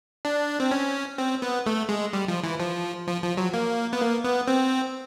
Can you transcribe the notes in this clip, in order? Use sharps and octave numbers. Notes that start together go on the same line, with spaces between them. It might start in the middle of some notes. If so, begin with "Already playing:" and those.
D4
C4
C#4
C4
B3
A3
G#3
G3
F3
E3
F3
F3
F3
F#3
A#3
B3
A#3
B3
C4